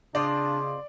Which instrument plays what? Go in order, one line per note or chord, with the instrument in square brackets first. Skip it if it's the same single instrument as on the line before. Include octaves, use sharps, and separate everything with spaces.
[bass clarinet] C#3 [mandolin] C4 F4 D#5 [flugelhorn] D4 [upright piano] D5